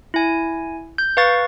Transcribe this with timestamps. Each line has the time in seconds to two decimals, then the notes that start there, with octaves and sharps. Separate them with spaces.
0.14 E4 G#5
0.98 G6
1.17 B4 F5 C#6 A6